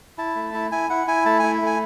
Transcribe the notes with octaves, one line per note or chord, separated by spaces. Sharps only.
E4 A5
A3
E4
E4 G#5
E4 F#5
E4 G#5
A3 A5
E4 G#5
A3 G#5